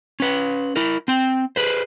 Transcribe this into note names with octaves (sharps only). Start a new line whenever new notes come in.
C#4 B4
E4 A#4
C4 G5
G#4 B4 C5